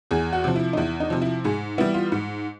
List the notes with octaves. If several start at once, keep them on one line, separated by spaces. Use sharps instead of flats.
E2 G#4
F#4
C3 F3
E4
D#4
E2 E4
D#4
C3 F3
E4
G#2 G#4
E3 G3 B3 E4
F4
G#2